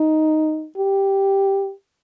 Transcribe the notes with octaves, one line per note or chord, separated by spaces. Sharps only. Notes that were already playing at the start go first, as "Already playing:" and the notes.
Already playing: D#4
G4